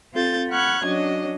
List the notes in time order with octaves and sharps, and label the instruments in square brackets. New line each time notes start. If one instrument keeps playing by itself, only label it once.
[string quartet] C4 F4 A4 G6 A6
F#5 B5 C#6 F6 F#6 G#6
F#3 C#4 D4 F#4 D#5